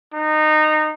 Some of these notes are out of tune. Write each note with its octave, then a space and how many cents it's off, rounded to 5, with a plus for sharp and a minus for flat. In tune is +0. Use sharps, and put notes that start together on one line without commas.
D#4 -20